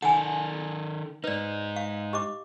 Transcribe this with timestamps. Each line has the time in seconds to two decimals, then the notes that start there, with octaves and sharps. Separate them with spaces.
0.02 D#3 A4 F#5 G#5
1.24 G#2 D#4 B4 D5
1.76 F5
2.13 G4 D#5 D6